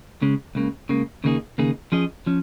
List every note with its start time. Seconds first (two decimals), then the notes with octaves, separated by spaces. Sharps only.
0.21 C#2 C#3 G#3 C#4
0.55 C#2 C#3 A#3
0.89 C#2 C#3 A#3
1.24 D#2 C#3 A#3 D#4 G#4
1.58 D#2 C#3 A#3 D#4 G#4
1.92 F3 C#4 G#4 D#5
2.26 F3 C#4